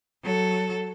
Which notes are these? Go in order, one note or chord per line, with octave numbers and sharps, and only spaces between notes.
F#3 A4